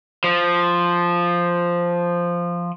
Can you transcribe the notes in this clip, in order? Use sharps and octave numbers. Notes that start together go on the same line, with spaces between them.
F3